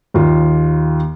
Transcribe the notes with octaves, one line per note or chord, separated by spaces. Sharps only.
D#2 F4